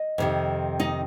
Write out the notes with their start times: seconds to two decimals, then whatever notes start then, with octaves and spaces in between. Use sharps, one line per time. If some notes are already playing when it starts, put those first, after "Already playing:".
Already playing: D#5
0.18 F2 C3 D#3
0.80 D#4 D#5